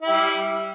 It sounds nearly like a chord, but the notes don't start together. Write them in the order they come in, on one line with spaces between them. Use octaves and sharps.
E4 G4 G3